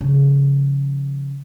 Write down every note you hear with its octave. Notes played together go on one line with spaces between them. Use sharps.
C#3 F3